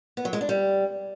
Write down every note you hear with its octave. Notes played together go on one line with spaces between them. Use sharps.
B3
F#3
G#3
D4
G3